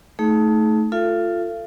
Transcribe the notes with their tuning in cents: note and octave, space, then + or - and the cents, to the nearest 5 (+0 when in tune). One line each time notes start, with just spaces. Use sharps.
A3 +0 D#4 +15 G#4 +35
F4 +0 A4 +15 F5 -45